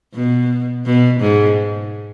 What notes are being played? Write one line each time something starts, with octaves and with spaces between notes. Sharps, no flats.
B2
B2
G#2